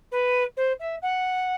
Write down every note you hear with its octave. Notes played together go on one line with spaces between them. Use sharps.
B4
C5
E5
F#5